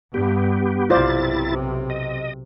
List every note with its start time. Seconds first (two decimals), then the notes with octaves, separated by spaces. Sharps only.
0.14 G2 B3 G4
0.90 B1 C3 E4 F4 C5 D5 A6
1.90 D#5